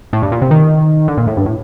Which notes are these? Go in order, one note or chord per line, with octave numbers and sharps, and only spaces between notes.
A2
G2
A#2
C3
D#3
D3
A#2
A2
G2
A2